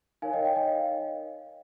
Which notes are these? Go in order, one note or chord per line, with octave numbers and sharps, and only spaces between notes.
D#4 A#4 C#5 F5 G#5
D#5 G5
D#5 G5
D#5 G5
F5